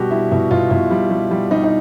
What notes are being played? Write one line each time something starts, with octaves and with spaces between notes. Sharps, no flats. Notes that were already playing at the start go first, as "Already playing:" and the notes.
Already playing: B2 G3 F#4 G4
G3 E4
B2 E4
B2 F4
B2 E4
G3
G3
G3
G3 D#4
D#4